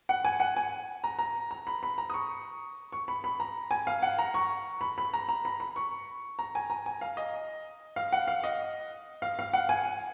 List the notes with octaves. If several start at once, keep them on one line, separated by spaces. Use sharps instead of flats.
F#5
G#5
F#5
G#5
A#5
A#5
A#5
B5
B5
A#5
D#6
C#6
C#6
B5
B5
A#5
G#5
F5
F#5
A#5
C#6
B5
B5
A#5
A#5
B5
B5
C#6
A#5
G#5
A#5
G#5
F5
D#5
F5
F#5
F5
D#5
F5
F5
F#5
G#5